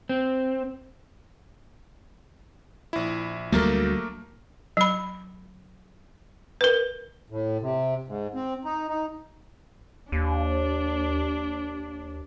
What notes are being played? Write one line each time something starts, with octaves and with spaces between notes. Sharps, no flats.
C4
A#1 E4
D2 F#3 G3 A3 A#3 A#4
F#3 B5
A#4 B4
A2
C3
G#2
C4
D#4
D#4
D#2 D4